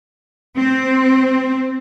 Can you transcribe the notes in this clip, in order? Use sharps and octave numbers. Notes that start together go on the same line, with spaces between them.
C4